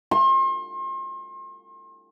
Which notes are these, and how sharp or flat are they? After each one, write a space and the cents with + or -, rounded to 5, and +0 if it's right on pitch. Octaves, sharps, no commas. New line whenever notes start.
C6 +40